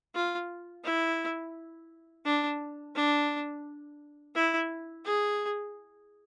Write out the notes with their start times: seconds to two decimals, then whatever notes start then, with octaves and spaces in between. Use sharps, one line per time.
0.15 F4
0.84 E4
2.25 D4
2.96 D4
4.35 E4
5.05 G#4